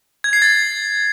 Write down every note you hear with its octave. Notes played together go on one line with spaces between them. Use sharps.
G#6
C7
A6